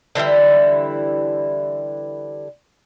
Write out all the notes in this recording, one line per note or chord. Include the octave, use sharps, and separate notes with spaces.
D3 E3 G3 E4